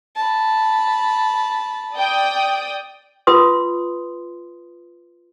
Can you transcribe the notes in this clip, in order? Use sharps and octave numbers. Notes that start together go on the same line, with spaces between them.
A5 B5
D5 G5 D#6
F4 B4 C6 D#6